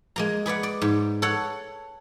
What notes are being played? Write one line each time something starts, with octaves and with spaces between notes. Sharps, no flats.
G#3 A#3 A#5
G#4 B4 D5 F#5
D5
G#2
A4 C#5 F#5